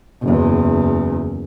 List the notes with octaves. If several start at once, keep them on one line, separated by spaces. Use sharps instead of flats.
F#1 E2